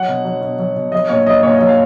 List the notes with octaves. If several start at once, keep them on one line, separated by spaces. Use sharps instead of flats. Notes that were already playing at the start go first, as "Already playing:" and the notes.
Already playing: F#3 F#5
B2
F#3
B2
F#3
B2
F#3 D#5
A#2 C#5
F#3 D#5
A#2 C#5
F#3 D#5
F5